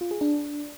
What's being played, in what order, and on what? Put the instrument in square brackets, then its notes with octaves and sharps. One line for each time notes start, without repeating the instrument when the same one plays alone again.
[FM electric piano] F4
G#4
D4